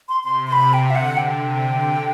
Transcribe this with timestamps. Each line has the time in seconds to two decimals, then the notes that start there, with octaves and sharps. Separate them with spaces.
0.09 C6
0.23 C3 C6
0.47 C6
0.52 C3 B5
0.73 G5
0.91 E5
0.95 D3 F#5
1.17 G5
1.39 C3
1.68 D3